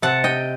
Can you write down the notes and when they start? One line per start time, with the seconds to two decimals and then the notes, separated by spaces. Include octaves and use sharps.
0.02 C3 F#5 A5
0.24 D#5 G5